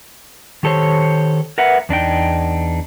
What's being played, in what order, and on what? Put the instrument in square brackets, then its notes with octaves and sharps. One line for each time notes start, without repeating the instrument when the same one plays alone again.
[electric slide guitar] D#3 G4 A4 C5 C#5
A#4 B4 E5 F#5
E2 D4 D#4 G5